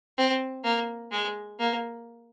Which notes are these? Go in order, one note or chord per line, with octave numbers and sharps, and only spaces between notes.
C4
A#3
G#3
A#3